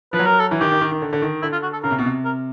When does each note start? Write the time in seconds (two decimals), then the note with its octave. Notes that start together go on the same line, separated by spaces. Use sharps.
0.13 F3 B4
0.19 F#3
0.27 A#4
0.40 A4
0.51 E3
0.60 D#3 G4
0.71 D#3
0.81 D#3
0.91 D#3
1.02 D3
1.13 D3
1.22 D#3
1.42 D3 E4
1.52 F4
1.63 F#4
1.73 A4
1.83 C#3 A#4
1.91 C3
1.99 B2
2.05 C3
2.25 A#4